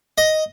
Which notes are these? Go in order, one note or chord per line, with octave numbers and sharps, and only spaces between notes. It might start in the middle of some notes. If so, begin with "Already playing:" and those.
D#5